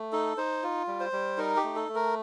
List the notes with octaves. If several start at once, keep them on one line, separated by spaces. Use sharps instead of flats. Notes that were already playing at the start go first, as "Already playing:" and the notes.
Already playing: A3
D#4 A4
D#4 C5
F4
G3
C5
G3
D#4 A#4
G4
A3
A4
A3
A#4